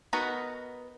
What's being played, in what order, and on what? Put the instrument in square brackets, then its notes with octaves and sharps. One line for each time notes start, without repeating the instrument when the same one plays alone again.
[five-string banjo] B3 D#4 F#4 A#4 B4